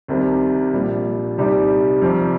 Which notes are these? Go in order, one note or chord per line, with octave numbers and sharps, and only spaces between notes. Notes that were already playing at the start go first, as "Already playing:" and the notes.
C2 C3 D#3 G3
A#1 A#2 G3
C2 C3 G3 D#4 G4
F2 C3 G3